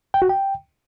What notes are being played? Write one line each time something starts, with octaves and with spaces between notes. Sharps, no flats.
G5
F#4
G5